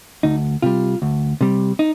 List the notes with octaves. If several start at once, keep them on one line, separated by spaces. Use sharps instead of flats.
D2 D#4
C3 G3 F4
D2
C3 G3
D#4